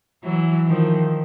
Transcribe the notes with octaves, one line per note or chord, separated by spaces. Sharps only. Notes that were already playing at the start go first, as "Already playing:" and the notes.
E3 F#3
D#3 F3